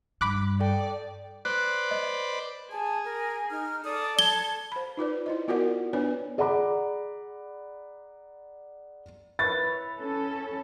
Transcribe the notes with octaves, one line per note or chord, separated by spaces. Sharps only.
G2 B5 D6 F#6
A4 D5 G5
B4 C5 D5 F#6
D#5
G#4 A5
A#4
D#4 F6
A4 D5 D#6
A5 G#6 G7
C5 B5
D#4 F4 B4 D5
E4 C5 D#5
B3 F4 F#4 A#4 D5 F#5
B3 D4 B4 C#5 D5 G#5
G#4 D5 F#5 A#5 B5 D6
E4 B4 C#5 A6
C#4 A4